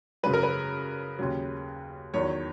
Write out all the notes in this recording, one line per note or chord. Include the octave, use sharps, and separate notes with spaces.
F#2 C#3 F#3 B4
A#4
B4
D#2 C#3 F#3
E2 D#3 F#3 C#5